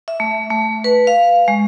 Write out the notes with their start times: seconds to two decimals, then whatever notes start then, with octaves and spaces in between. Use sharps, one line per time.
0.08 E5
0.20 A3
0.50 A3
0.84 B4
1.07 F5
1.48 G#3